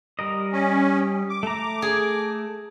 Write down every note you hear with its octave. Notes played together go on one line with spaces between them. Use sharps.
G3 A#4 D#5
C#4
D6
A3 A#5
G#4